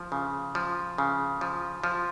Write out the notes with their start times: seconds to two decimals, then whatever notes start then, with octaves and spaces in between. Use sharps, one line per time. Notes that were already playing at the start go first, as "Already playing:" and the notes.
Already playing: F3
0.12 C#3
0.55 F3
0.98 C#3
1.41 F3
1.84 F3